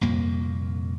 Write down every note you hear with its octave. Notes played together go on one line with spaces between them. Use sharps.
C2 F2 A#2 A#3